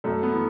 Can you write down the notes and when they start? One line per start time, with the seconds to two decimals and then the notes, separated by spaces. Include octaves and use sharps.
0.04 F#2 A3
0.23 B3
0.33 E3